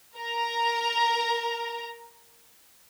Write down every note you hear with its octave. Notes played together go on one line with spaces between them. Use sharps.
A#4 A#5